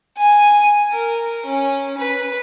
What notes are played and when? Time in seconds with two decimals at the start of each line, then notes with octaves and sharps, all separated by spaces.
0.17 G#5
0.92 A#4
1.46 C#4
1.98 B4